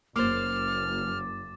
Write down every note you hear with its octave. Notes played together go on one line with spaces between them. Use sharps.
F#1 A#3 C5 D6 F6 A6